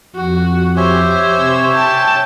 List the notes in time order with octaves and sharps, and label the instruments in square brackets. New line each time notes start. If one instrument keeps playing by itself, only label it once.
[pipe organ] F2 [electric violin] F#4
[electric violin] G4 C5 [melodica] C#5 E5 G#5
[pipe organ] C3 E6
[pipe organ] G5 [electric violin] A5